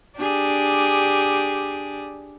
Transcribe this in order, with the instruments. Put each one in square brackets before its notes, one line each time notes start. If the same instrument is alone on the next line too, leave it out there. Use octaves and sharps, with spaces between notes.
[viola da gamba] D4 G4 G#4